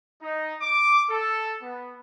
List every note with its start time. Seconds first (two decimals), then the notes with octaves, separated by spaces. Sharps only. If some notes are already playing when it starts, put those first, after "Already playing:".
0.22 D#4
0.62 D6
1.10 A4
1.62 B3